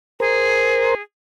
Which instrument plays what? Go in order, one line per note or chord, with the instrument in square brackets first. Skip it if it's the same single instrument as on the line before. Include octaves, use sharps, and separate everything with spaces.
[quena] G#4 [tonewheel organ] A#4 C5